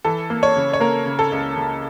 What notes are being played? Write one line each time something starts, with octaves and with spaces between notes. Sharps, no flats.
E3 A4
A#3
C#5
C#3
C#5
A#3 A#4
C#3
A4
C#2
C#3